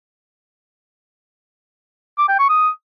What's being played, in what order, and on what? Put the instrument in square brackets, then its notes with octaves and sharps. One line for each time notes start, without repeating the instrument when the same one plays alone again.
[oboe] D6
G5
C#6
D#6